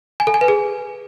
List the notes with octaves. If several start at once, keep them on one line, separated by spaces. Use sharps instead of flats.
G#5
A4
G#5
B4
G#4